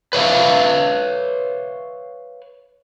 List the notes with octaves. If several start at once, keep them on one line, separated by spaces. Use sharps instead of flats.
B4 C#5 E5 F5